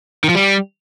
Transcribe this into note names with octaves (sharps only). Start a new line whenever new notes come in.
D#3
F3
G3